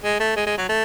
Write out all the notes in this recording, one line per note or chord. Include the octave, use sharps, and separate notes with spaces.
G#3
A3
G#3
G#3
F#3
A3